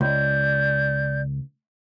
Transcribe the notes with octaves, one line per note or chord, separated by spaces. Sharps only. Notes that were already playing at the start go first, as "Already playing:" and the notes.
C#2 D5 G6